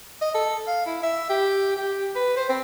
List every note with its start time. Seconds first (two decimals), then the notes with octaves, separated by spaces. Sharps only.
0.21 D#5
0.34 A4
0.67 F5
0.86 E4
1.03 E5
1.29 G4
1.76 G4
2.15 B4
2.36 C5
2.49 C4